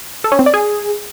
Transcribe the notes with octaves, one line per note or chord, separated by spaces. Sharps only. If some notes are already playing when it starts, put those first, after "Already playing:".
A4
C#4
C4
D5
G#4